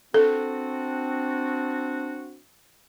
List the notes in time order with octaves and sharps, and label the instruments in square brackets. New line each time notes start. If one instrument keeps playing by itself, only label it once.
[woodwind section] C4 D4 F#4 [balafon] A4